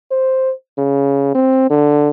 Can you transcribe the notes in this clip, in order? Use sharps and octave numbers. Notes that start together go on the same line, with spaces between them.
C5
C#3
C4
D3